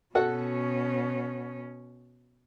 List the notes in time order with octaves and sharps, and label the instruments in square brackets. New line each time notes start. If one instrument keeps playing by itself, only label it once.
[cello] B2 C#4 [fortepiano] F#4 A4 F#5